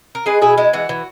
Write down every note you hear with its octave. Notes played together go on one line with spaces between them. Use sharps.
A#4
G#3 G#4 B4
B2 E4 G#4
G#3 E4
E3 F#4
E3